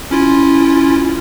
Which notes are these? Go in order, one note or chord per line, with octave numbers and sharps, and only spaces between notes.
C#4 E4 F4